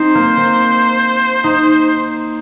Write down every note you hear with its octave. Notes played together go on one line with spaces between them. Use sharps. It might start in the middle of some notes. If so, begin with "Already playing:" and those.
Already playing: C4 D#4 C5
A#3
C4
D#4